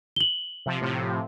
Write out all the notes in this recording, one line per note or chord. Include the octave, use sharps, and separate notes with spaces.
F#7 G7
C3 F3
A2 C3 F3